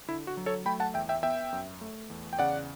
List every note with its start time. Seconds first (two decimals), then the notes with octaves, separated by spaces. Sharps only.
0.08 D3 E4
0.27 F#4
0.37 F#3
0.46 A4 C#5
0.65 A3 G5 B5
0.80 F#5 A5
0.94 E2 E5 G5
1.09 E5 G5
1.23 B3 E5 G5
1.53 F#2
1.81 A3
2.10 E2
2.33 G5
2.39 C#3 D5 F#5